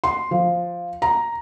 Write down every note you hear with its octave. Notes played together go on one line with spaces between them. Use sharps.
C6
F3
A#5